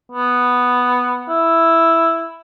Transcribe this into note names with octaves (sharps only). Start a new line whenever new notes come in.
B3
E4